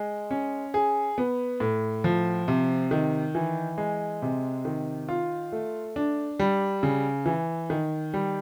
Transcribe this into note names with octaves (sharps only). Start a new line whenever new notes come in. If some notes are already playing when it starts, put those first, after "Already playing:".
Already playing: G#3
C#4
G#4
B3
A2
F3
C3
D#3
E3
G#3
C3
D#3
F4
A3
D4
G3
C#3
E3
D#3
G3